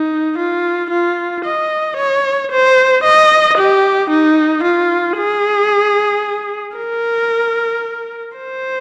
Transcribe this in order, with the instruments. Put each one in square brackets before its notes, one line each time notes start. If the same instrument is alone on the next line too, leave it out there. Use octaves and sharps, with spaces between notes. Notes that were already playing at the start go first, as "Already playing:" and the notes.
Already playing: [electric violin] D#4
F4
F4
D#5
C#5
C5
D#5
G4
D#4
F4
G#4
A#4
C5